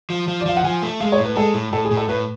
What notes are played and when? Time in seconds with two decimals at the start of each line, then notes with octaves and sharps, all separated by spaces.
0.10 F3
0.28 F3
0.41 D5
0.46 F3 F5
0.56 F#5
0.64 F3 G#5
0.83 A3
1.00 G#3 F5
1.12 C#5
1.18 A2
1.25 B4
1.36 G#3 A4
1.54 A2
1.73 A2 A4
1.85 G#4
1.91 A2
1.97 A4
2.09 A2 B4